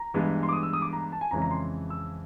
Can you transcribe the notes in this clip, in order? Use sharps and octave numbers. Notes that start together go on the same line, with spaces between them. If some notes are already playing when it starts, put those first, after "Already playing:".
Already playing: A#5
G2 E3 G#3 B3
C6
D6
D#6
E6
D#6
D6
A#5
A5
G#5
F2 C#3 E3 G#3 C#4 A#5
A#5
C6
E6